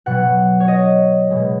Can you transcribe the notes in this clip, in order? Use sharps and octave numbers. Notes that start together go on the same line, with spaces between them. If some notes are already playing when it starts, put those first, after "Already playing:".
B2 F#3 F#5
C#5
D#5
B2 G#3